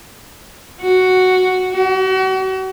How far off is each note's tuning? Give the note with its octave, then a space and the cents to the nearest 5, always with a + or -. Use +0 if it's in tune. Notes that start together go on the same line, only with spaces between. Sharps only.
F#4 +0
F#4 +40